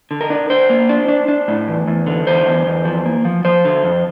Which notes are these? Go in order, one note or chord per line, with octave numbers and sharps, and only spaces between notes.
D3
A#4
D4
D4 C5
A#3
D4
D4
D4
A2
E2
E2
D3
E2 C5
E2
E2
F3
A#3
F3
F3 C5
D3
F2